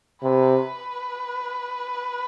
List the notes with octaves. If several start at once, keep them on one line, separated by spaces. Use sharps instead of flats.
C3 B4